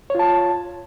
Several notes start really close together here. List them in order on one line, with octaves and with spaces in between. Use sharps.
C#5 F4 A5